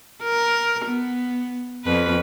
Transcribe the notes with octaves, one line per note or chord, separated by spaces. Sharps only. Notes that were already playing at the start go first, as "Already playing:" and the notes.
A#4
B3
F2 B4